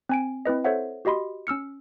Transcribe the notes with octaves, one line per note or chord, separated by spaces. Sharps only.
C4 G#5 D7
C4 E4 B4 D#5
A4 C5 C#5 E5 F#5
F#4 G4 D#5 B5 C6
C#4 E6 F6 C#7